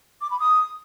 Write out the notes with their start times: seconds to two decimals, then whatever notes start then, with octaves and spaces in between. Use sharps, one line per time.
0.21 D6
0.31 B5
0.40 D#6